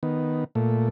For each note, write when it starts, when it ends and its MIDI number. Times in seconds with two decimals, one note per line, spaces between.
0.03 0.44 51
0.03 0.44 59
0.55 0.89 46
0.55 0.89 57